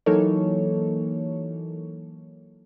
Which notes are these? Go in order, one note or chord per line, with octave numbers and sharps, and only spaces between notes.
E3 F#3 A#3 D#4 A4 C#5